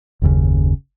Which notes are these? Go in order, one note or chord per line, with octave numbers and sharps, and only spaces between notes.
F#1 D#2 C#3